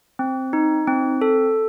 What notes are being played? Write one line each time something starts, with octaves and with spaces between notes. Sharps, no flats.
C4
D#4
C4
A4